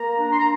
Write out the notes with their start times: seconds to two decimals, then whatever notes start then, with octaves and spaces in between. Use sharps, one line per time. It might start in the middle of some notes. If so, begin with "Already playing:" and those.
Already playing: A#3 A#5
0.19 D4
0.33 C6
0.40 A#5